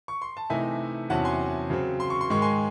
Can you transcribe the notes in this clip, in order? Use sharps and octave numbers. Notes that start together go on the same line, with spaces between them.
C#6
C6
A5
C3 E3 A3 D#4 E5 G#5
E2 C3 F#3 C#4 E4 F#5 A5
G#5 C6
C#3 F#3 C4
C6
C#6
C6
G#2 D#3 G#3 C#6
G#5 C6